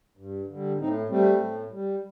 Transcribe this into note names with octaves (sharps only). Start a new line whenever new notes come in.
G2
D3 G3
A2 C4 D#4
G3 A3 C4
A2
G3